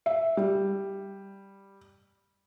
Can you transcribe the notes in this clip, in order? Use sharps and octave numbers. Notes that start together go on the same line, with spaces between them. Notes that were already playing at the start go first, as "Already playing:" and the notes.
E5
G3